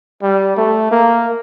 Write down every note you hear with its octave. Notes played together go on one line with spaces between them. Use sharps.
G3
A3
A#3